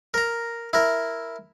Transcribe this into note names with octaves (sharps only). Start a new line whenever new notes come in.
A#4 A#5
E4 A#4